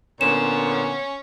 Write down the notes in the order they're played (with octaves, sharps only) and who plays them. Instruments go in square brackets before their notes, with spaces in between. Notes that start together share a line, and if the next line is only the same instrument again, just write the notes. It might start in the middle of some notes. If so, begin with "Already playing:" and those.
[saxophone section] A#2 D3 B3 [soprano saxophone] C#4 [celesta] E7